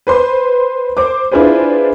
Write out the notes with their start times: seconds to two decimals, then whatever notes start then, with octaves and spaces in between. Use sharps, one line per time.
0.07 B4 C5 C6
0.97 C5 D6
1.32 D4 E4 F4 G#4 B4 C5